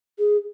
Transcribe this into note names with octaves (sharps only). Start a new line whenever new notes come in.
G#4